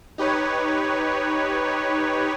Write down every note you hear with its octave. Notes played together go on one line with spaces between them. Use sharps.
D#4 G4 B4 C#5